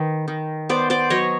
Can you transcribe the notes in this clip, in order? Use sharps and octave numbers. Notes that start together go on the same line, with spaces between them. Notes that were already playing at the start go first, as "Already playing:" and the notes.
Already playing: D#3 B4
D#3
B3 C5 D5
C5 D5
F#3 C#5 D#5